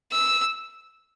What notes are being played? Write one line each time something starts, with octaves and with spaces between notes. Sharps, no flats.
E6